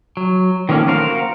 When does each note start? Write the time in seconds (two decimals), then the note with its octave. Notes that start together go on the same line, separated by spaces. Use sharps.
0.17 F#3
0.69 D#3 F3 A3 A#3 C#4
0.88 F#4 A#4 C5 F5